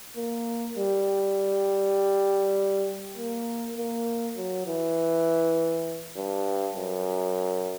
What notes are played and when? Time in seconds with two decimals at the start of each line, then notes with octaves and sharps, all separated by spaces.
0.17 A#3
0.77 G3
3.17 A#3
3.77 A#3
4.36 F#3
4.67 E3
6.17 G2
6.77 F#2